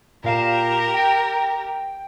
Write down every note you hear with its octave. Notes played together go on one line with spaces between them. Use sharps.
A#2 G4 A#4 F5 E7
G5